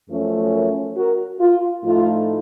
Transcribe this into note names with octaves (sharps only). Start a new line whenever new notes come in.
F#2 F3 A3 C#4
A#4 C#5
F#4 A#4
F4
A2 F3 A3 D#4 F4